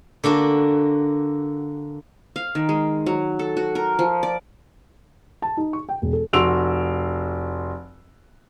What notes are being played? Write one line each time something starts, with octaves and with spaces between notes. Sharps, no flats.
D3 A#3 D4 F#4
F5
D#3
G#3
F#3
A4
F#4
A#4
F3
D5
A5
D#4
C#6
G5
E1
A4
F1 F#4 C6 E6 D7 F7